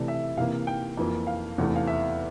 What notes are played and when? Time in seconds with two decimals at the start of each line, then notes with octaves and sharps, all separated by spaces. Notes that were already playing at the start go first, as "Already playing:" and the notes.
Already playing: C3 E3 A3 D5
0.08 E5
0.37 C3 E3 A#3 F5
0.67 G5
0.97 F2 E3 A#3
1.27 F5
1.58 E2 C3 E3 A3
1.76 F5
1.87 E5